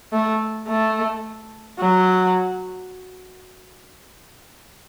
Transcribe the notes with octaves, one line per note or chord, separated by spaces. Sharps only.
A3
A3
F#3